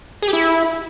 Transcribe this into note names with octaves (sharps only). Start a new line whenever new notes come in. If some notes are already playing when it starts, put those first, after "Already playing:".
G#4
G4
E4